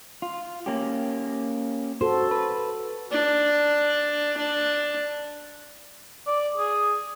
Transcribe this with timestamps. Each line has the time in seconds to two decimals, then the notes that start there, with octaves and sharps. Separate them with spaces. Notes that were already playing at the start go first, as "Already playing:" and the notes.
0.22 F4
0.66 A#3 C#4 G4
2.01 F#4 A4 C5
2.31 B4
3.11 D4
4.37 D4
6.27 D5
6.58 G#4